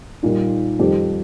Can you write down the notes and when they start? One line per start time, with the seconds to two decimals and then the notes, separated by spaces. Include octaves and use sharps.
0.23 A#2 G3 A#3 D#4
0.79 F2 D#3 G3 C4 G4